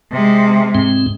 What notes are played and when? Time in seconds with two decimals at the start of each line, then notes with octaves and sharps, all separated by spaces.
0.11 C3 G#3
0.75 G#2 C4